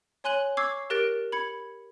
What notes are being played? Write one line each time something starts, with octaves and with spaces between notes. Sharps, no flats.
C#5 G#5 C6 F#6 D#7 F#7
C#6 D6 E6 G#6 C7
G4 A#4 F#6 A6 A#6 D7
B5 G#6 C#7